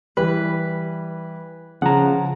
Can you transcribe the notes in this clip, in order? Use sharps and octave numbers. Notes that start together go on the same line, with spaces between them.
E3 G3 B4
C#3 F3 F#5 A#5